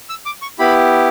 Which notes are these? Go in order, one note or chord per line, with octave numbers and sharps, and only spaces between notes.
E6
D6
C#6
B3 E4 G4 B5